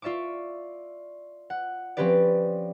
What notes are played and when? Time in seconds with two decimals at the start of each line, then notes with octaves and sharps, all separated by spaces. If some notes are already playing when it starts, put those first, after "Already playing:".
0.02 F4 D5 E5 C#6 D6
1.50 F#5
1.97 F3 C4 C#4 G4 B4 D5